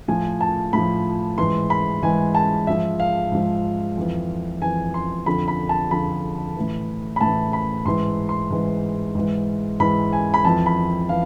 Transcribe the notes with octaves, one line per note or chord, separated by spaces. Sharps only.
A2 F3 G#5
A5
A2 F3 B5
G#2 E3 C6
B5
G#2 E3 G#5
A5
G#2 F3 E5
F5
G#2 F3
F2 E3
F2 E3 G#5
C6
F2 D3 F3 B5
B5
A5
F2 D3 F3 B5
A2 E3
B5
A2 E3 A5
B5
G#2 E3 C6
C6
G#2 E3
G#2 E3
G#2 E3 B5
G#5
B5
F2 E3 A5
B5
E3 F5